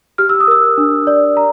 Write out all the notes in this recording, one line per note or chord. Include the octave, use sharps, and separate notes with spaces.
G4 F6
E6
D#6
A#4 E6
D4
D5
A#5